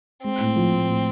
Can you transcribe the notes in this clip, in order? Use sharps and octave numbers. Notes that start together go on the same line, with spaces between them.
G#3 C4
A2
F3
A2
A2